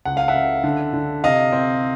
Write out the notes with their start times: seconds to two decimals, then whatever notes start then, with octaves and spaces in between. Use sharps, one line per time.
0.05 C#2 F#5
0.17 F5
0.28 E5 F#5
0.34 C#3
0.64 D3
0.93 D3
1.24 C3 D#5 F5
1.52 C4